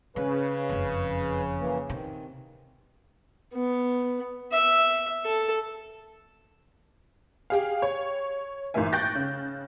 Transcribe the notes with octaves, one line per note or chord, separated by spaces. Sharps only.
C#3 C#4 B4
F#1 F2
E3 A#3
C3 D#3
B3
E5
A4
G4 G#4 F5
C#5
G#1 A#2 E3 A#3 E5 G#5
G5 C#6 F#6 G6 A6 A#6
C#3